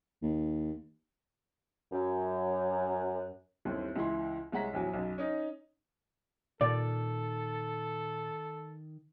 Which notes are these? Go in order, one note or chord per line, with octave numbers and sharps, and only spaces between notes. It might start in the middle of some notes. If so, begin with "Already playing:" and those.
D#2
F#2
G1 D#2 C4 E4
C#2 E3 E4 C6
C2 G#3 C#5 F#5 A#5 B6
A#1 E2 F#3
B1 F#2
C#4 D#4
A#2 D#3 A4 D5